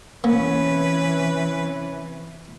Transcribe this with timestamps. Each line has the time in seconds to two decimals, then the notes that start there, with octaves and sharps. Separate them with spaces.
0.24 C3 E3 A#3 C#4 B4